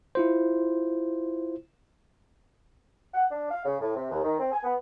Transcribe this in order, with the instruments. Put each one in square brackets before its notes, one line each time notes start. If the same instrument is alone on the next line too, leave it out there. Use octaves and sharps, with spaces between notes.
[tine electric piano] E4 F4 C5
[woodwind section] F#5
D4
F5
C#3
A2
C3
D#2
D#3
C4
G#5
B3